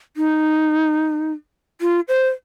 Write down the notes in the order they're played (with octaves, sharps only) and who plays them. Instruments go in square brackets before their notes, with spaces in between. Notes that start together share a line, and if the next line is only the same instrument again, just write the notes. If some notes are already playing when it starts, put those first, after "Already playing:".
[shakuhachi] D#4
F4
C5